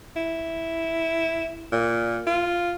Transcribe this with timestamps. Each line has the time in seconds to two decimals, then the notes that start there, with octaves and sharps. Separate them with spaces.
0.16 E4
1.72 A#2
2.27 F4